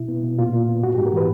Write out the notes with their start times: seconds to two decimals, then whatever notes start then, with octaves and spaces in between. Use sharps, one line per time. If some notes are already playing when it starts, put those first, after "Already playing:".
Already playing: B2 E4
0.08 B3
0.24 B2
0.39 A#2 F4
0.53 A#2
0.69 B3
0.83 G#2 F#4
0.95 G4
0.98 G#2
1.06 A#4
1.13 E3 B4